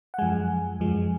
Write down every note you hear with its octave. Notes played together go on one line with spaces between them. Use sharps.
F#5
F#2 F3 G#3 G#5
F#2 F3 G#3